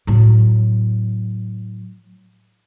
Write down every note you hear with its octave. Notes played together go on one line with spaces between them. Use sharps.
A2 F#3